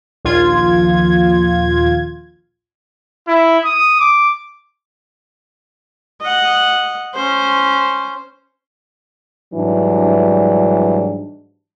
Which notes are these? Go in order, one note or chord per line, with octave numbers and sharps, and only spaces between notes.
A#1 D#2 F4 G#6
E4
D#6
D6
D#5 F#5
C#4 C5
G#2 E3 F#3 G3 D4